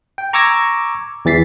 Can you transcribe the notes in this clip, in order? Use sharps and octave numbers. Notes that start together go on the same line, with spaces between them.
G5
A#5 C#6 D6 E6 G#6 A#6
E2 E3 A6 B6 C7